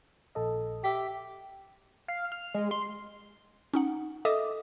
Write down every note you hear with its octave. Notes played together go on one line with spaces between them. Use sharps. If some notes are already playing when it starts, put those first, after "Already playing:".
A#1 A4 D#5
G4 E5 B6
F5
F6
G#3
C6
C#4 D#4 F#5
A4 D#5 E5 D6 D#6